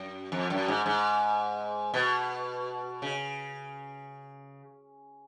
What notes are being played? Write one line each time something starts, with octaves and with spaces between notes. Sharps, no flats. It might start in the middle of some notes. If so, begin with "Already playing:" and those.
Already playing: F#2
F2
F#2
G#2
G#2
B2
C#3